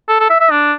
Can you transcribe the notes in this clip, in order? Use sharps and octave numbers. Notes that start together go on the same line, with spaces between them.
A4
A4
E5
E5
D4